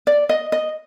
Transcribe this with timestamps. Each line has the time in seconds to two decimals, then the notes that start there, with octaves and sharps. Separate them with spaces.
0.07 D5
0.29 D#5
0.52 D#5